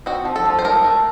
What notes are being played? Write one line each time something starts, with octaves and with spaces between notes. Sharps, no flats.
C4 F#4
F3
A4
F3
C5
A3 A#4
A3